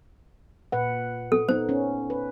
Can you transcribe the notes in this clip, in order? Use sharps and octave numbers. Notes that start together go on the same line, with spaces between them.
A#2 B4 F#5
A4
B3 D#4 C5
C#4
B4